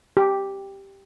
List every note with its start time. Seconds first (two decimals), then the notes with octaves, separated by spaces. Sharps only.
0.17 G4